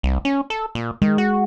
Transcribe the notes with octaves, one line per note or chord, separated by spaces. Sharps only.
C2
C#4
A4
A#2
D#3 G#3
F#4